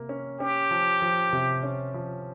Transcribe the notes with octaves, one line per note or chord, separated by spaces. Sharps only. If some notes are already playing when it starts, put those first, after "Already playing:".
Already playing: C3 A#3
C#4
C#4 G4
F3
F3
C3
C#4
F3